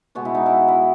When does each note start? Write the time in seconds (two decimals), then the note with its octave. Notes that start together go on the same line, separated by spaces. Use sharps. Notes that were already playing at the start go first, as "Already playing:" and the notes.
0.15 B2 G#3 B3 F#4
0.25 E4
0.35 D#4
0.46 E4
0.68 E4